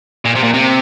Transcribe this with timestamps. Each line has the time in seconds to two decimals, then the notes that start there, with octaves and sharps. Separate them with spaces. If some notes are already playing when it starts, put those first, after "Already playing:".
0.25 A#2
0.35 C3
0.43 A#2
0.54 C3